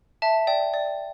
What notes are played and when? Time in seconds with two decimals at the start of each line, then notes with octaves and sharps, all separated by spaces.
0.22 E5 A5
0.47 D5 G5
0.74 D5